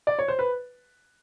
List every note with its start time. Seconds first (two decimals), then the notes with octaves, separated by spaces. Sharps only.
0.07 D5
0.19 C#5
0.28 C5
0.39 B4